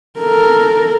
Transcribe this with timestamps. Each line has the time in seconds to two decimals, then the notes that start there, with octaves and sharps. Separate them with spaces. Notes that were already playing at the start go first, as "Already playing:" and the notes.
0.19 A4 A#4